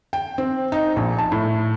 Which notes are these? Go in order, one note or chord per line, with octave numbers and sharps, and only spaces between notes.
G5
C4
D#4
A#1
A5
A2